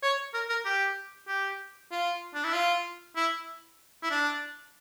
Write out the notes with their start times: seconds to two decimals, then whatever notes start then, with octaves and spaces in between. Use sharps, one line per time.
0.02 C#5
0.34 A#4
0.49 A#4
0.65 G4
1.28 G4
1.91 F4
2.34 D4
2.44 E4
2.54 F4
3.16 E4
4.03 E4
4.11 D4